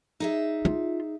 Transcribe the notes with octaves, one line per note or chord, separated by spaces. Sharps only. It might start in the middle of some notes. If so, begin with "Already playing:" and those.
D#4 G#4 E5
F4